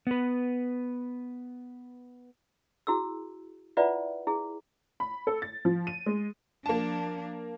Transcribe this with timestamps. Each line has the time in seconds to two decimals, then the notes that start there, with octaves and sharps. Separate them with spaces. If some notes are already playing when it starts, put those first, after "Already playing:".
0.07 B3 B4
2.87 E4 F#4 G#4 E6
3.77 E4 F4 B4 D5 E5 F#5
4.27 E4 G#4
5.00 B5
5.27 A4
5.42 A6
5.65 F3
5.87 D#7
6.06 G#3
6.66 F3 A#3 D4 A5